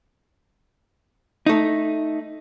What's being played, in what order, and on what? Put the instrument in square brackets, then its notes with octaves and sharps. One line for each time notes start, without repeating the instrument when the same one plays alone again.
[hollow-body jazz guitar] A3 D#4